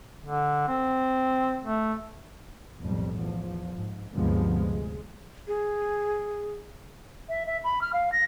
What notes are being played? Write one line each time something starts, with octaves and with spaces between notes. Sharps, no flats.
D3
C4
A3
B1 F2 A2 G3
E2 F3
G#2
D2 G2 C3 F3 G#3 B3
G#3
G#4
E5
E5
B5
F6
F5
A#6